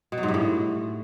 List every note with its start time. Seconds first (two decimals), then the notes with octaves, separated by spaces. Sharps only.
0.12 B2
0.18 F#3
0.23 G#2
0.28 G2
0.34 A2